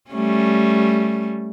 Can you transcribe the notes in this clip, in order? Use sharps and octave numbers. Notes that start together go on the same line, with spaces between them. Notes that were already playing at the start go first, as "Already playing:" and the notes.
G3 A3 C#4